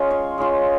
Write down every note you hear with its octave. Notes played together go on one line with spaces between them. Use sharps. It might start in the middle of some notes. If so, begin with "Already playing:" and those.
Already playing: G#3 C#4 F4 D#5 F5
C#5
G#3 C#4 F4